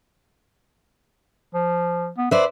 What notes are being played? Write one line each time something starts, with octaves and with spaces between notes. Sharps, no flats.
F3
B3
B4 C5 D5 E5